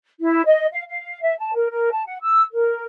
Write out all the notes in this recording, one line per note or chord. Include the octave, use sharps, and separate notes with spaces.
E4
D#5
F5
F5
E5
A5
A#4
A#4
A5
F#5
E6
A#4